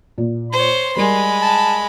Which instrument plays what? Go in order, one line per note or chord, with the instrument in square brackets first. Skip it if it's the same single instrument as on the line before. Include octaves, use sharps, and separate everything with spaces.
[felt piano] A#2
[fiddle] C5 C#5 [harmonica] C6
[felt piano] G3 A#4 [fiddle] G#3 B5
[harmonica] A5